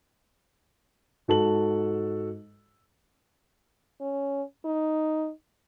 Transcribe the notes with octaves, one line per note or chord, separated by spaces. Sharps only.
G#2 F#4 A4 A5 F#7
C#4
D#4